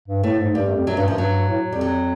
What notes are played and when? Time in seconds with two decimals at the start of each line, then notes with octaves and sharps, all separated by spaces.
0.08 G2
0.23 A2 A3
0.39 G#2
0.55 G2 G3
0.66 F#2
0.76 F2
0.87 F#2 F#3
0.97 G2 F#3
1.08 F#2 F3
1.18 G2 F#3
1.49 A2
1.70 F2 G3
1.81 F#3